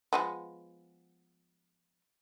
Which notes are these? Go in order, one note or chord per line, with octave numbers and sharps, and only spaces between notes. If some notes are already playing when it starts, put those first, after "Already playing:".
F3 G#3 B3